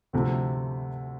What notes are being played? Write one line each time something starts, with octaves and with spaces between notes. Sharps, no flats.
D2 C3 F3 A3